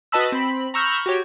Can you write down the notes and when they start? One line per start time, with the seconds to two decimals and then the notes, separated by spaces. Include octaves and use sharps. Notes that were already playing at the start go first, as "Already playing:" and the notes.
0.12 F#4 B4 D#5 A5 B5 E6
0.32 C4 B5
0.74 A#5 B5 C#6 E6 F6 G6
1.06 F#4 G4 C#5